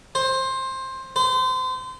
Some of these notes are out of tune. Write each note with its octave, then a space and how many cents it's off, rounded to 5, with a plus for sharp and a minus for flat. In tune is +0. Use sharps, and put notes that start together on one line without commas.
C5 +15
C5 -30